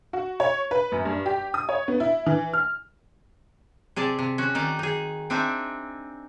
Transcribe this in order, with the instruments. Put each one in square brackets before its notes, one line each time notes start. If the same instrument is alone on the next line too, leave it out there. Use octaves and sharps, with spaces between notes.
[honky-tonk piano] F#4
C#5
B4
F#2
G2
G4
D#6
C#5
B3
E4
E3
F6
[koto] C3 G#4 D5 A5
C3
C#4 F#4
D#3 D#4 D5 D#5
D#4 G#4
C4 D4 D#4 E5 G#5